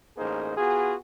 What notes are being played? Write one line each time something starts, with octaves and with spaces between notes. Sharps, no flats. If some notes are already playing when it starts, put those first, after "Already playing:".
A1 A#3 D#4 G#4 A#4 C5
B3 F4 F#4 G#4